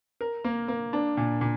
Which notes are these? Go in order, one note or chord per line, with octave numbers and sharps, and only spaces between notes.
A#4
A#3
A#3
D4
A#2
A#2